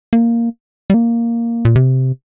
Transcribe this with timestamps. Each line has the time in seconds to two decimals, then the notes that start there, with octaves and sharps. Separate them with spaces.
0.13 A#3
0.90 G3
0.94 A#3
1.65 A#2
1.76 C3